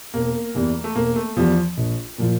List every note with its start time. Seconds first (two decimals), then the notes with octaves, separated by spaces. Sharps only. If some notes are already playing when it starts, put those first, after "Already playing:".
0.14 E1 A#3
0.55 E2 E3 G3
0.84 A3
0.95 E1 A#3
1.16 A3
1.36 E2 E3 F3 G3
1.77 A#1
2.18 A#2 F3